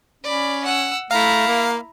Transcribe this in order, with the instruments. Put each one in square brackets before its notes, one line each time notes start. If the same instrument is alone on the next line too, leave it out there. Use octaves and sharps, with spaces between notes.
[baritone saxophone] C#4 [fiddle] D5 B5
[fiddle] F#5 E6
[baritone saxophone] A3 [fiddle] E4 A#5 [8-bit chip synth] F5
[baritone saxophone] A#3